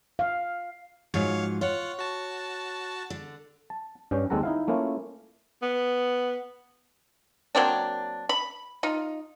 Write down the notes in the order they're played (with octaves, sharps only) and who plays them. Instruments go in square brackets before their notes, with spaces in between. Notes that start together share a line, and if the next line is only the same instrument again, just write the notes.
[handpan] F5
[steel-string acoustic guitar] G#2 F3 F#3 [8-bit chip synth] C#5 F5
[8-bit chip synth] F4 F#5 [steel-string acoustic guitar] C#5
[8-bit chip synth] F#4 A5
[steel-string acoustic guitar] D3
[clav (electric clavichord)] A5
G2 G3 C#4 G5
D#2 G#3 C4 A4 F#5 A#5
D#4 E4 F5
A3 A#3 C#4 E4 F4
[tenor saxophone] B3
[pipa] F#3 A#3 C4 D4
B5
D#4 F4